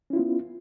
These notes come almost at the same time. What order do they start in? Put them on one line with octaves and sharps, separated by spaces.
C#4 E4 F4 B3